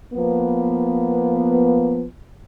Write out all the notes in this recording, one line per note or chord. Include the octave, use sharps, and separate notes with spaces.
F3 A#3 B3